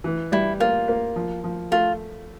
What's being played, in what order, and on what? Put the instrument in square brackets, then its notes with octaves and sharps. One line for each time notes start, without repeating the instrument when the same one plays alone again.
[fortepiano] E3
[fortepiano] G3 [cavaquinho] E4
[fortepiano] A#3 [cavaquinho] F4
[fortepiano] A#3
F3
F3
[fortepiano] A3 [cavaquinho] F4